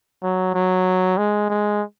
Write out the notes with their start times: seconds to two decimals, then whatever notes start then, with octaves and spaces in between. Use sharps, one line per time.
0.23 F#3
0.55 F#3
1.17 G#3
1.49 G#3